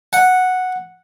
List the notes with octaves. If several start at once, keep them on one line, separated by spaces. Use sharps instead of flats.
F#5